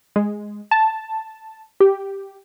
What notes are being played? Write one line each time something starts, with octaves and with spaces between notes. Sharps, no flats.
G#3
A5
G4